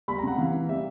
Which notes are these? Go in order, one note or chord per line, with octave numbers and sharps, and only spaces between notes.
G3 B5
A#5
C3 F#5
E3 F5
C3
G3 E5